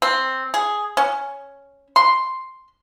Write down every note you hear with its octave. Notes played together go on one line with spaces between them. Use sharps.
C4
G#4
C#4
C6